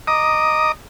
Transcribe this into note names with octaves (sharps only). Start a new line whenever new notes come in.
D#5 A#5 D6 D#6